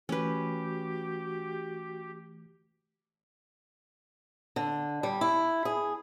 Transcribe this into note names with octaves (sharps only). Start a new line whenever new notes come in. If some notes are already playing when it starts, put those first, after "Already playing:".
E3 A3 C#4 F#4 G4 B4
D3
G3
E4
G#4